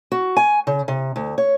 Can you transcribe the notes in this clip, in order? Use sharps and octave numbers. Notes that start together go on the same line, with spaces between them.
F#4
G#5
C#3
C3
D2
C#5